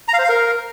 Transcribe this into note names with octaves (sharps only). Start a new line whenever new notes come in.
A#5
F5
C5
F5
A#4